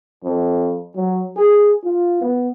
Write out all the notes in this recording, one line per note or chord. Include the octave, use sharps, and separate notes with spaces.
F2
F#3
G#4
F4
B3